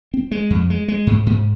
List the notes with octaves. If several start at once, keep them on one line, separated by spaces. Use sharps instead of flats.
C4
G#3
F2
G#3
G#3
G#2
G#2